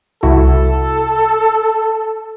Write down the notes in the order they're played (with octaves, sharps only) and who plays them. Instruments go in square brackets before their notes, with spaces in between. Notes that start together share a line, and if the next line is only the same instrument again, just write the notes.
[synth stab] C2 E4 F#4 [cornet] A4